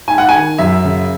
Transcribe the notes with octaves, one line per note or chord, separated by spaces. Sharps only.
G#2 G#5
F#5
D#3 G#5
F#2 E5
C#3